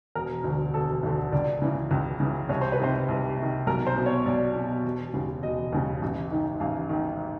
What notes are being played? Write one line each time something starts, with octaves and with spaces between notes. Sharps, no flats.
E1 A#4
D2
D3
E1 A4
D2 D3
C#2 D5
C#3 E3
C#2
C#3 E3
C2 C#5
C5
B4
C3 D#3 C5
C2
C3
D#3
B1 A#4
C5
B2
C#5
B1 D5
B2
E1
D#2 C#3
E1 D#5
D#2 C#3
A1
G#2 D#3
A1 F5
G#2 D#3